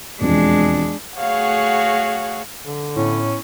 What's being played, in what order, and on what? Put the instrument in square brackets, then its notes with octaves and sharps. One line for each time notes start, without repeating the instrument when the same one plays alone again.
[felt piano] E1 F2 [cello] G#3 D4
[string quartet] A3 F#4 G#4 C#5 F5 F#5
[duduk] D3
[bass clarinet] A2 [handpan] B3 E4 [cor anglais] C#4